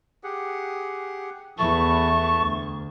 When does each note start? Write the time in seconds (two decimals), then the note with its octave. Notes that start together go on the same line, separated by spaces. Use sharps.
0.24 G4 G#4 F#5
1.58 E2 E3 A3 A5 C#6
2.38 D2